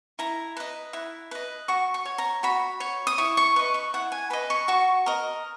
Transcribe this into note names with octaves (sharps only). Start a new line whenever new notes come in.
E4 A#5
B4 D#5
E4
B4 D#5
F#4 C#6
C#6
C#5
A#5
F#4 B5
C#5
D#6
E4 C#6
C#6
B4 D#5 C#6
C#6
E4 F#5
G#5
B4 D#5 B5
C#6
F#4 C#6
A#4 D#5